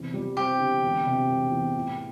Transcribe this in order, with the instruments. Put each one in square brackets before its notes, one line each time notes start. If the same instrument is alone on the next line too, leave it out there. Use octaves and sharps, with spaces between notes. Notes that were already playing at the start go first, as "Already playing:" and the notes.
Already playing: [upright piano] E2 C3
G3
[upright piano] C4 [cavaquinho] G4
[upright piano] D3
E1
C3
E1
E2
A2